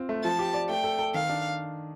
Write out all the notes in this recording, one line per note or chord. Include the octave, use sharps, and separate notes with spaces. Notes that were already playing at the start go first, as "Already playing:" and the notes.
Already playing: C4 F4
A3
F3 A5
G4
D5
A3 G5
A4
A4
D#3 F5
D4